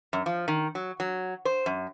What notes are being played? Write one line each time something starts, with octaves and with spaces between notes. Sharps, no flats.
F#2
F3
D#3
F#3
F#3
C5
F#2